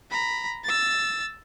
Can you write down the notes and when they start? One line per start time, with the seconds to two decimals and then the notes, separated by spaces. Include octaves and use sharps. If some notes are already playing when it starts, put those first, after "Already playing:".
0.11 A#5 B5
0.64 E6 A6